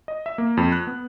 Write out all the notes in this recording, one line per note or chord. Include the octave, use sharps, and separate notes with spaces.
D#5
E5
A#3
F2
F#6
B3